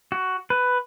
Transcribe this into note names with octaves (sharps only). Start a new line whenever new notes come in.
F#4
B4